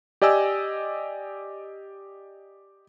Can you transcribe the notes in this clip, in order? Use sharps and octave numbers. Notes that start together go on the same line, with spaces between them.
G4 D5 D#5 G#5 E6